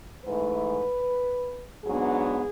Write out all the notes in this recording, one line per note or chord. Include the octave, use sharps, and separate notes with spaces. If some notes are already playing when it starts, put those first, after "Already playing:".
G#2 E3 A3 B4
G#2 F#3 B3 D4 G#4